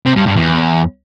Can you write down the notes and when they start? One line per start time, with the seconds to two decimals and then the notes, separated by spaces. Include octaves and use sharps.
0.06 C3
0.16 G2
0.27 G2
0.37 E2